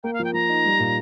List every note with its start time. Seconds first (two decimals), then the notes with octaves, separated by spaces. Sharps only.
0.03 A#3 G5
0.13 F5
0.19 F3
0.24 G5
0.34 F3 A#5
0.49 D#4
0.65 G3
0.79 A#2